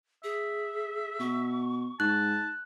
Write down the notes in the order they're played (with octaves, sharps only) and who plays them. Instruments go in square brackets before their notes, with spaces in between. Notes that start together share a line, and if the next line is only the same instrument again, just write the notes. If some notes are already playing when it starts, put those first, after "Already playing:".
[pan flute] G#4 [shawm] E5
[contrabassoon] B2 [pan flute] C#6
[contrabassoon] G#2 [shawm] A5 [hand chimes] F#6